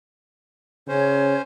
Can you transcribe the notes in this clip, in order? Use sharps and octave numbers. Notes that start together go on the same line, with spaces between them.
C#3 C#4 C5 C#5